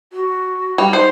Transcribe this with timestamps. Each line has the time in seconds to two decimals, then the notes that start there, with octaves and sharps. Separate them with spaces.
0.13 F#4
0.78 G3
0.93 D#4 C5